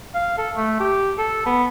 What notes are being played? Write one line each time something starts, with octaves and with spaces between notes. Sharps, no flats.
F5
A4
A3
G4
A4
B3